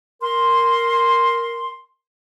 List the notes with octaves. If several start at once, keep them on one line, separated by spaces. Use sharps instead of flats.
A#4 C6